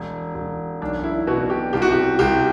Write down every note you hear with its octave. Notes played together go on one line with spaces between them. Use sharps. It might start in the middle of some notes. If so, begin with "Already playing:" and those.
Already playing: E1
E1
B1 D4
E4
B2 F#4
G4
C2 G4
F#4
G4
C2 G4